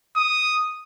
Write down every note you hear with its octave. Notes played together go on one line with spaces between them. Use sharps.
D#6